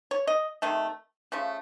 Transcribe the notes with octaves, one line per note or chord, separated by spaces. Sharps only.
C#5
D#5
C3 D#3 A3
C#3 F3 A3